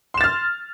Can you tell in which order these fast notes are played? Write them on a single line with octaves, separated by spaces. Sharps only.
C6 E7 A6 F6